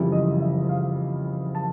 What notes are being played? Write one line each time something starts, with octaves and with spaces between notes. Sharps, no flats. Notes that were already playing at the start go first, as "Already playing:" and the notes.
Already playing: F#1 F2 C#3 E3 G3 E5
D#5
E5
F5
A5